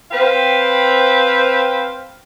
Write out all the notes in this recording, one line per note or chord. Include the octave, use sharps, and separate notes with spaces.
C4 B4 C5 F5 G5